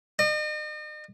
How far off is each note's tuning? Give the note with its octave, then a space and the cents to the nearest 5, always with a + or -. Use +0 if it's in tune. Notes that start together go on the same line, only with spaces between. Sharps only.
D#5 -40